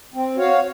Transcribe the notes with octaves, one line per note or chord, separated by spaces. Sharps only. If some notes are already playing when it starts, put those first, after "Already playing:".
C4
F#4 C#5 F5